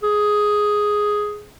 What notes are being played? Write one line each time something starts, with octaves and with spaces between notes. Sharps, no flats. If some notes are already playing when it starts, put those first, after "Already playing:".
G#4